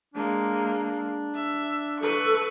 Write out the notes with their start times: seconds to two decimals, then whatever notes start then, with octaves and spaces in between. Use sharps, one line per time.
0.14 G#3 A#3 D4
1.35 E5
2.01 A4 B4 C#6